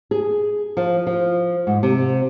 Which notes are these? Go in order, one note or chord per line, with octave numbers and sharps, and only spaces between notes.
G#4
F3
F3
G#2
C3